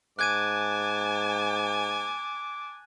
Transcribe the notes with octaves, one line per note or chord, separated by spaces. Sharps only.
G#2 G#5 A5 D6 F#6 G#6 D#7